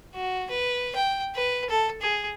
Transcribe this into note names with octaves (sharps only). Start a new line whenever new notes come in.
F#4
B4
G5
B4
A4
G#4